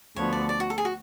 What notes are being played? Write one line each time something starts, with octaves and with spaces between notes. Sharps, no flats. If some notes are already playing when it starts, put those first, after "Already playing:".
D2 D3 F3 B3 F#4 C#5
D5
D5
F#4
A4
G#4
F#4